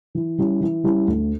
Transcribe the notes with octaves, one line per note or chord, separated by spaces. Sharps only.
E3
G3 C#4 E4
E3
G3 C#4 E4
D2